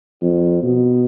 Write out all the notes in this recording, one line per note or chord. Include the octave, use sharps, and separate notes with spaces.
F2
B2